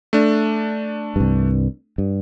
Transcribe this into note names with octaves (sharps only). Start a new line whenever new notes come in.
A3 D4
C2 G2
G2